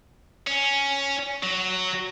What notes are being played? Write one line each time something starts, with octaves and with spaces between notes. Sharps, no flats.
C#4
F#3